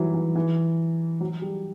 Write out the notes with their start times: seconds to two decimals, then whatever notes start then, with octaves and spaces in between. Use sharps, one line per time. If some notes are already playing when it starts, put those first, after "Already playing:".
Already playing: E3 F#3 G3
0.14 E3
0.35 E3
1.21 F#3
1.42 G3